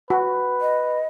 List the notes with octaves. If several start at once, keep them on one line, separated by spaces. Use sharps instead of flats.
F#4 B4
D#5